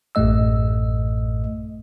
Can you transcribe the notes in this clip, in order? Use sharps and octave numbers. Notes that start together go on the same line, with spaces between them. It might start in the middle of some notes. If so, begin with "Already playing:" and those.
A1 F#2 A2 A3 D#5 E6